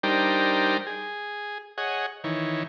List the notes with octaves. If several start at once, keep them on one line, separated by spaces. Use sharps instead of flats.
G3 D4 D#4 A#4 C5 G5
G#4
G#4 C#5 D#5 F#5
D#3 E3 C#5